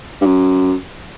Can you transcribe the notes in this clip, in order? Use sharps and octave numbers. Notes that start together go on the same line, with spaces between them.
G2
F#2